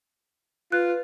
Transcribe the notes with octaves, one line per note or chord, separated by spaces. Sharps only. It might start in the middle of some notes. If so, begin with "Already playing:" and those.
F4 B4 F#6